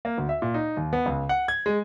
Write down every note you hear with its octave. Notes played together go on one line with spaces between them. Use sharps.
A#3
D2
E5
A#2
D#4
D#2
B3
C#2
F#5
G#6
G#3